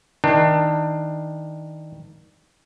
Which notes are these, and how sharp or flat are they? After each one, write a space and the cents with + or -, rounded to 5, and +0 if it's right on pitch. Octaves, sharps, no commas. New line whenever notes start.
D#3 +25 D4 +25